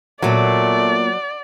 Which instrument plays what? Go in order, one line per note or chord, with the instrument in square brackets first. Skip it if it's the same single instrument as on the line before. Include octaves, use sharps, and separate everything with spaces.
[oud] A#2 B3 [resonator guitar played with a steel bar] F#3 [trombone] A3 [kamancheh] D5